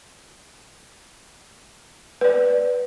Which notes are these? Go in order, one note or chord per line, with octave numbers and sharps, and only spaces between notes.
B4 D5